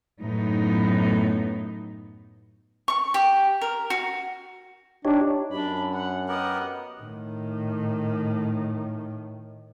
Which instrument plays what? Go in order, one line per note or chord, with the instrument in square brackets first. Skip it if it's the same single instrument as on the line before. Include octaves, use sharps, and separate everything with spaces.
[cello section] F#2 A2 B3 D#4
[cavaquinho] C#6
G4
A#4
F#4
[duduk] D4 [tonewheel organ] D#4 G4 C#5
[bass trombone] F#2 [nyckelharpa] D4 B5
[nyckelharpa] F#5
[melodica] B3 G4 A#4 [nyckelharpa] D#5 F#5
[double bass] A2 D#3